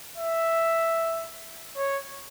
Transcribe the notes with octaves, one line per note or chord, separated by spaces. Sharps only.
E5
C#5